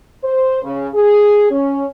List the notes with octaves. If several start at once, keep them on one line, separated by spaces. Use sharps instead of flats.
C5
C#3
G#4
C#4